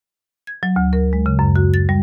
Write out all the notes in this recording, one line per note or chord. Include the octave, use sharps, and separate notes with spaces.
G#6
F#3
D2
A#4
G#3
C#3
F#2
F#4
A6
G3